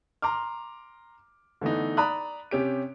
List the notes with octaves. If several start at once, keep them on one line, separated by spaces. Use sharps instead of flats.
A#5 C6 D6 F6
D3 E3 A3 B3 D#4
D5 A#5 B5 D#6 F#6
C3 C#4 G4 D7